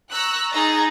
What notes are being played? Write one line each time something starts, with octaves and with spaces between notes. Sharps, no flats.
A#5 C#6 E6 F#6
D#4 G#4 D#5 A#5 A6